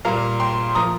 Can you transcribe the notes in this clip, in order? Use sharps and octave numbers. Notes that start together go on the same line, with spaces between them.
A#2 G3 A#3 F5 A#5
G5 C6
F3 A#3 A#5 D#6